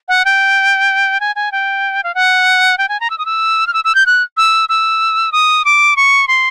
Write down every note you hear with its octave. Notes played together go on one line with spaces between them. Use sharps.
F#5
G5
G#5
G#5
G5
F5
F#5
G5
G#5
A#5
E6
D#6
E6
F6
E6
E6
G6
F#6
E6
E6
D#6
D6
C#6
C6